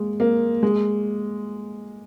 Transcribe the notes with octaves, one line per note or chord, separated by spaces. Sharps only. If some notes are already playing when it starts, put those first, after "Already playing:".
Already playing: G#3 A#3
A#3
G#3